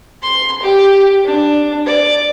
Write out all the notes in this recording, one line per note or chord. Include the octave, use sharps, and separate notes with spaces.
C6
G4
D4
D5